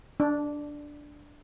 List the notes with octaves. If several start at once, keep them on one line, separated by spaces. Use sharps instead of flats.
D4